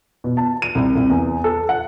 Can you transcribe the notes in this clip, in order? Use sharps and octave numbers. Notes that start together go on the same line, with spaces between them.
B2
A5
D#7
C2
C2
E2
A4
F#5